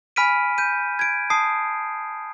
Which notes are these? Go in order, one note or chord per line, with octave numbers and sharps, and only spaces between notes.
G#5 B5 F6 B6 D7 D#7
G6 D#7
G#6 D7
A5 D#6 C7